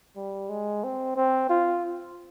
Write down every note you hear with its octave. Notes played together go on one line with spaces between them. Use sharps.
G3
G#3
C4
C4
F4